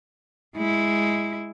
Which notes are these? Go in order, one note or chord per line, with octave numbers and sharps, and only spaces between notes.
G#3 E4